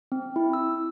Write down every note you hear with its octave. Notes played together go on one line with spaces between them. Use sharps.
C4
E4
E6